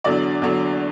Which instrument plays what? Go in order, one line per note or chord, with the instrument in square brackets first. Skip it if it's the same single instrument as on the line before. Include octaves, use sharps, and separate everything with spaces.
[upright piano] E2 D3 F#3 D5
E2 D3 F#3